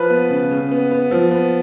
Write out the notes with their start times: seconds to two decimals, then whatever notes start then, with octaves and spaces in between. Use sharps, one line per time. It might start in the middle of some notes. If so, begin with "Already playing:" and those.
Already playing: F3 B4
0.10 B3
0.30 C#3
0.51 C#3
0.71 B3
0.91 B3
1.11 F3
1.31 B3